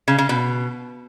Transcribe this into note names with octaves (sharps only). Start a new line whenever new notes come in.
C#3
C#3
B2